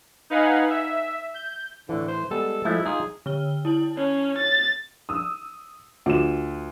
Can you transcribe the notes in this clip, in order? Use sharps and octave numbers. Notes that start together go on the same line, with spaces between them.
D#4 B4 F5 F#5 G#5
E5
G6
A2 D3 E3
C5
G3 G#3 B3 A4
F3 G#3 A3 E4
D#4 F4 G#4 F5
D3 F6 G7
E4 A5 F#7
C#4 C#5
A6
D#6 E6
D2 F4 F#4 E7